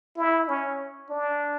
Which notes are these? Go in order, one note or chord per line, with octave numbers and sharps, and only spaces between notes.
E4
C#4
D4